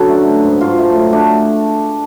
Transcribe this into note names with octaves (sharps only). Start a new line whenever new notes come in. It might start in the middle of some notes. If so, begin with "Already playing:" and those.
Already playing: F#2 D3 F#3 F#4 A4 B4
A3
F#3
G#2
G#2 F4
A3
F#3
A3 D4